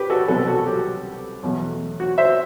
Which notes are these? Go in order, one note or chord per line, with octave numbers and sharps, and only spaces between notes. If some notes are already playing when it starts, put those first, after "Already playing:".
Already playing: G4 B4
F#4 A4
C2 B2 F#3 F#4 A4
F#4 A4
G4
E2 B2 F#3 A3
F#4
C5 E5